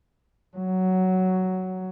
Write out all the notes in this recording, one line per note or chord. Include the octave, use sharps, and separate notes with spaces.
F#3